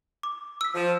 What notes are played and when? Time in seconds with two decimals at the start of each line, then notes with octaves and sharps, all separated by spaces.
0.23 D6
0.61 E6 B6
0.75 F3